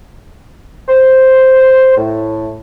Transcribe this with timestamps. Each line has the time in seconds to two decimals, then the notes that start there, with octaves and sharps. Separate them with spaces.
0.89 C5
1.97 A2